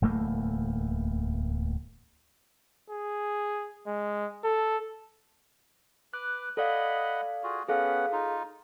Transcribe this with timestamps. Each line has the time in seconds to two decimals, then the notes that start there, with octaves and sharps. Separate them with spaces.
0.02 D1 E2 A3 A#3
2.90 G#4
3.87 G#3
4.44 A4
6.14 B4 D6 F#6
6.57 A4 D5 D#5 F5 F#5 B5
7.43 F4 F#4 G#4
7.68 B3 C#4 G#4 A4 F5 F#5
8.12 D#4 F4